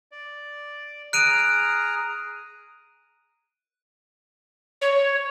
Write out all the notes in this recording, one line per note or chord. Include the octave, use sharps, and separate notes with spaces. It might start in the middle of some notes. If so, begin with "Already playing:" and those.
D5
G#4 A#5 F6 F#6 D7 D#7
C#5